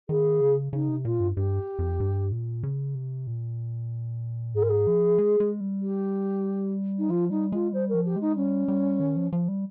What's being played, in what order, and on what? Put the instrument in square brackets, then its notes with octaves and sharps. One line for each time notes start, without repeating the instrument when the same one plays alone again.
[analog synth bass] D#3 [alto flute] G#4
[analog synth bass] C#3
[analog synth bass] C#3 [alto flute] D#4
[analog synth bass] C3
[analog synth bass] A#2 [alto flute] F4
[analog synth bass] G2
[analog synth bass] G2 [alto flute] G4
[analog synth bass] F2
G2
A#2
C#3
C3
A#2
[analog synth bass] G#2 [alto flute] G#4
[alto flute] A#4
G#4
[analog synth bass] F3
G#3
G#3
G3
[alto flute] G4
D#4
[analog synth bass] F3 [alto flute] F4
[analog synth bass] G3 [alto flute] D#4
[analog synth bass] G#3 [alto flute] F4
[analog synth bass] G3 [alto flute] C5
[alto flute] A#4
[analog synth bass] F3
[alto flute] G4
[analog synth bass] G#3 [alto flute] D#4
[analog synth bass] G3 [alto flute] C#4
[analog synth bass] G3
D#3
F3
F3
G3